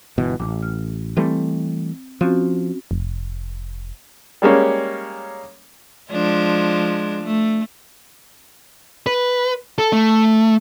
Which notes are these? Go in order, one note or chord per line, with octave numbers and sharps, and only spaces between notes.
G1 B2 E3
A1 D6
F6
E3 G3 A3 C4
F3 C4 C#4 F#4
F1
G3 G#3 A#3 C#4
F3 G#3 D4
A3
B4
A4
A3